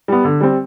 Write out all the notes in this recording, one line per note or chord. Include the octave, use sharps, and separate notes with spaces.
G3 B3
D3
G3 C4